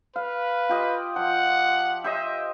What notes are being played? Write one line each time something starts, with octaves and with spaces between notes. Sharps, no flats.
B4 F5
F4 G4 D#5
F3 F#5
G4 C5 D#5 E5